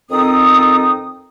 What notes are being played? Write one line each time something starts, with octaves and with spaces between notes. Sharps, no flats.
F2 D#3 C4 D#4 A4 D#6